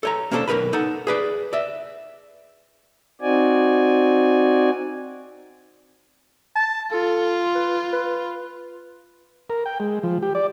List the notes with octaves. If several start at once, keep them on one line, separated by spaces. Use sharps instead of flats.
A4 C#5 A#5
A#3 C#4 D4 G#4 A4 C5
B1 E3 A#4 B4 B5
D#4 A4 F#5
G#4 B4 D5
D5 E5
C4 D#4 F#4 D5 G#5
A5
F4 A4
B4
B4
A#4
G5
G#3
F3
G4
D5